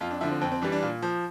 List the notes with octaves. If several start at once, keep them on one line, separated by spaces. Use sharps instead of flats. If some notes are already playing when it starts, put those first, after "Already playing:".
F2 F4
D4
D3 F3 E4
C4
F2 C4
C4
E3 G3 D4
D4
A#2
F3